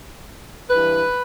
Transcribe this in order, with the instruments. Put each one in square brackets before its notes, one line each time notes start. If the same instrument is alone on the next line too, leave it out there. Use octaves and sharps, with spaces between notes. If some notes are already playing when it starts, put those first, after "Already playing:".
[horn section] G2 E3 B4